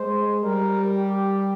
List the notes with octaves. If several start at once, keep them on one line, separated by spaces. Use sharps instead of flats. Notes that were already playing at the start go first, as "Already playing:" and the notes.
Already playing: G#3 C5
G3 A#4
G4